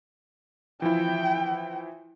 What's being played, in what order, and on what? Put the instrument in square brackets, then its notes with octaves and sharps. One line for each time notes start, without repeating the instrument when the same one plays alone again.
[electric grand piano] E3 F3 E4 [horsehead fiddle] G5